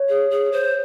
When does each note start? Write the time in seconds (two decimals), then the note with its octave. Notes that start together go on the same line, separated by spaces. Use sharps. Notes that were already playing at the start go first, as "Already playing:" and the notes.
Already playing: C#5
0.09 G#4
0.31 G#4
0.52 C5